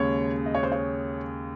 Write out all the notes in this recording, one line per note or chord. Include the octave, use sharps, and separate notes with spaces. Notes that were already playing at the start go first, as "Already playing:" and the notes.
Already playing: D#2 C#3 G#3 C#5
D#5
C#5
C5
C#5